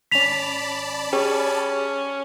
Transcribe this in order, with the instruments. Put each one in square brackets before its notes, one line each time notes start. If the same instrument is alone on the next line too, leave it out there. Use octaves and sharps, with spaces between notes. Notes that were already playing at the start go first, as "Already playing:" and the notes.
[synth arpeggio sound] G#1 C#4 [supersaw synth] D5 A5 B5 [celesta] B6 F7
[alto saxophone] C#4 [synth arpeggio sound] G4 G#4 C#5